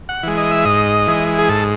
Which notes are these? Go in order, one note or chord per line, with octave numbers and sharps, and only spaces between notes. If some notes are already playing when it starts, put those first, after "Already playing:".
F#5
E3 G#3
D#5
E5
G#2 D#5
E3 G#3
G#4
G#2 A4